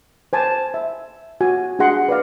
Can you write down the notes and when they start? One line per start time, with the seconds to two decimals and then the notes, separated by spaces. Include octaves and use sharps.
0.33 C5 G#5 A5
0.74 E5
1.41 F#4 G#5
1.79 D4 F#4 G#4 F#5 C6
2.09 B4 D5 F5